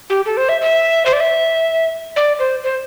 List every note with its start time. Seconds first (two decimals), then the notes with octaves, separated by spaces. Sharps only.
0.10 G4
0.26 A4
0.37 C5
0.49 E5
0.62 E5
1.06 C5
1.13 D5
1.20 E5
2.16 D5
2.39 C5
2.64 C5